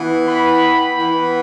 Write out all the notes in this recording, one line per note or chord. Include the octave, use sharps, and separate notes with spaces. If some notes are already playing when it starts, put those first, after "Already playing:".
Already playing: E3 B3
G5 B5
E3 B3